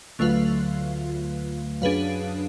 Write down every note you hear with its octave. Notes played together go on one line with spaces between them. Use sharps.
D2 D3 F#3 A3 F4 B4 F5
F#2 F#3 D4 G#4 B4 F5